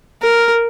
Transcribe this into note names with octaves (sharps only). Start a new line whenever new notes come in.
A#4